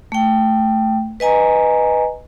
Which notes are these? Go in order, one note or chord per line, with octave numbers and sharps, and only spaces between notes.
A3 G5
B4 D#5 G#5 A#5